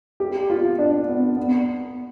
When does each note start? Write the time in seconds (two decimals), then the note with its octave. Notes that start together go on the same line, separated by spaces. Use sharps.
0.20 G4
0.50 F4
0.79 D4
1.08 B3
1.37 B3